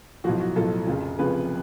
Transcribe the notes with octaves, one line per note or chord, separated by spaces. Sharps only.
B1 A2 F3 F#4
F#4
B1 A2 F3 A4
F1 F2 C#3 F3
F1 F2 C#3 F3 B4